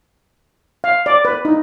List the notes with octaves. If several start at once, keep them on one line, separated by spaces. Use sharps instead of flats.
F5
D5
B4
D#4